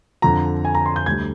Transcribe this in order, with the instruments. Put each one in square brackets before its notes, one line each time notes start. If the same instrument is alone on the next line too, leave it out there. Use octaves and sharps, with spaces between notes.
[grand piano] F2 D3 F3 A#5
G#5
A#5
C6
G6
D2 D3 G3 D4 G#6